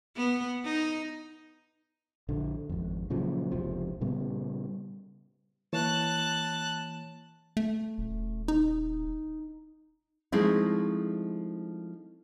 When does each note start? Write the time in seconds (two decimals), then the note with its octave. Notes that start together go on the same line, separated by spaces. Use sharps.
0.16 B3
0.65 D#4
2.28 A#1 D3
2.69 G#1 F2
3.10 A#2 C#3 F3 F#3
3.51 F1 C#2 C3 F3
4.01 A#2 C#3 G3 B3
5.73 E3 A#3 C#5 A5 F#6
7.57 A3
7.98 D#1
8.48 D#4
10.32 F3 G#3 A3 C4 D#4 E4